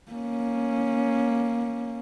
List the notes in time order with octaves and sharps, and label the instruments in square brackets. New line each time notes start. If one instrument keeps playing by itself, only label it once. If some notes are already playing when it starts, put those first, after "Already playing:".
[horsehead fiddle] A#3 C#4